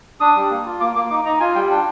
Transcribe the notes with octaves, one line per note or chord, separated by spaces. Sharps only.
D4 D#6
G3
A#3
F4
A#3 D6
A#3 D6
D#4 D6
D#4 A#5
F4 G#5
G3 G5
D4 G5